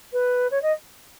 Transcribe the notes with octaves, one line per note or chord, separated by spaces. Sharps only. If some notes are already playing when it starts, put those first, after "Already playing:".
B4
C#5
D#5